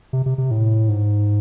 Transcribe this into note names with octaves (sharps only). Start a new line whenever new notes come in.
C3
C3
C3
A2
G#2